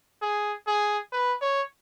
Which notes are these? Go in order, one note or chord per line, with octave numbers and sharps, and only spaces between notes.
G#4
G#4
B4
C#5